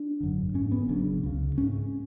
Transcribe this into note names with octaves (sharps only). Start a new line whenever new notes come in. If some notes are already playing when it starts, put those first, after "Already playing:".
Already playing: D4
G#1 F#2 D3
A1 G#2 C#4
B3
F#1 F#2 C#3 D4
C#2 C#3
G#1 G#2 C#4